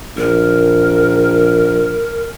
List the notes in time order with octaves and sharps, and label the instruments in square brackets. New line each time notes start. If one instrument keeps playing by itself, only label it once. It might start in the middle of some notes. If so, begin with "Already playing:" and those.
[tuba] A#1 [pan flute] A#4